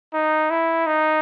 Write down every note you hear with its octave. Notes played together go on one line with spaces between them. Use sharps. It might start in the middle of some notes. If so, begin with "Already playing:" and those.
D#4
E4
D#4